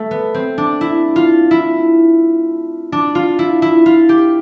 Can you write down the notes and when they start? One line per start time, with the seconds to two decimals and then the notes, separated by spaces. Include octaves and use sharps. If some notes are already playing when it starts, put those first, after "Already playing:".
Already playing: A3
0.11 B3
0.34 C4
0.58 D4
0.81 E4
1.16 F4
1.51 E4
2.92 D4
3.15 F4
3.39 E4
3.62 E4
3.86 F4
4.09 G4